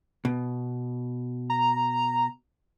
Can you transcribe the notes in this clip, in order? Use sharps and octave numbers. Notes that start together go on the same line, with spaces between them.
B2
A#5